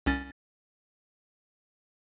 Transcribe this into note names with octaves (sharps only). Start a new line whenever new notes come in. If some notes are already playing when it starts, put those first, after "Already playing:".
C2 C#4 A6